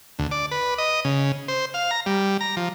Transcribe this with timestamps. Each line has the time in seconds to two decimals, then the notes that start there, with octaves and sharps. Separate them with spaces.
0.19 D2
0.31 D5
0.51 B4
0.78 D#5
1.05 C#3
1.48 C5
1.74 F5
1.91 A#5
2.06 G3
2.41 A#5
2.57 F3